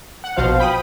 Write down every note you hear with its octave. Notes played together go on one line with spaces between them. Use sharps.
F#5
A#1 B2 F3 C5 F5
G5 B5 D#6